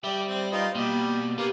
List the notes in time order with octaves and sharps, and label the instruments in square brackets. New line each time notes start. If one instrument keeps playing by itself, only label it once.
[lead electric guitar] G3 [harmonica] G4 [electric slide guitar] D5 E5
[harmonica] C4
[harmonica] D#4 F4 [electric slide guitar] B4 G5
[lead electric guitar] B2 [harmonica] G3 [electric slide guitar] A#3
[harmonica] A#3 [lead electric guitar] B3 [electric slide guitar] G4 B4 D5